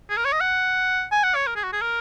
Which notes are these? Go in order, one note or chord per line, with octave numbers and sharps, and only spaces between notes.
G#4
A#4
C#5
D#5
F#5
G#5
F#5
C#5
A#4
G#4
F#4
G#4
A#4